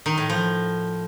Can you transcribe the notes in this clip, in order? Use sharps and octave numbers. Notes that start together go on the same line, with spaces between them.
D#3
A2
F3